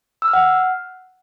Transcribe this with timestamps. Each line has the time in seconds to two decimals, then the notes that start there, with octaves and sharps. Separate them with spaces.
0.22 E6
0.28 F6
0.33 F#5